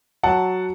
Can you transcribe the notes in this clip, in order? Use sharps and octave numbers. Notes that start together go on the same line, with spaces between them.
F#3 F#5 A5